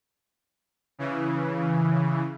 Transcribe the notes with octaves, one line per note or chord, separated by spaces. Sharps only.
C#3 E3